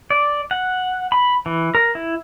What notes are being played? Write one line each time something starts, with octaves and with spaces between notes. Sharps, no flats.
D5
F#5
B5
E3
A#4
E4